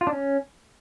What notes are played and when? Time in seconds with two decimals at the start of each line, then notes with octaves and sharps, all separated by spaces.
0.01 F4
0.07 D4
0.13 C#4